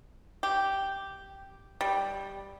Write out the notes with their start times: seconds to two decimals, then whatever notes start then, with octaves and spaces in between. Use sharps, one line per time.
0.43 G4
1.81 G3